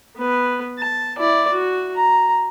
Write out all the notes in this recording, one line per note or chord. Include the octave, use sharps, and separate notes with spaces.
B3 B4
A5
E4 D5
F#4
A#5